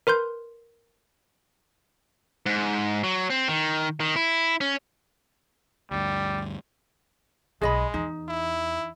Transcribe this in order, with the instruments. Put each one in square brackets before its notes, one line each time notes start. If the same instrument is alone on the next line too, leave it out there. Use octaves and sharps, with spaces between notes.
[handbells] A#4 B4 C6 G6
[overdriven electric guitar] G#2
F#3
C4
D#3
D#3
E4
C#4
[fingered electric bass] D2 G2 [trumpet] G3
[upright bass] B1 [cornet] G#3 [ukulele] G#4 D#5 B5
[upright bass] E2 [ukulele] D#4
[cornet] E4